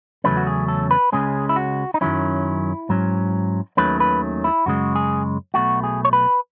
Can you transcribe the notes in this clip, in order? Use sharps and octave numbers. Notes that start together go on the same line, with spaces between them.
E2 C#3 F#3 A3 C#4 B4
F#4
G#4
A4
B4
C#2 C#3 G#3 C#4 G#4
E4
F#4
D#4
F#2 D#3 F#3 C#4 E4
G#2 F#3 C#4
D#2 D#3 F#3 A3 C#4 B4
B4
E4
F#2 C#3 G#3 F#4
G#4
B1 B2 A3 F#4
G#4
C#5
B4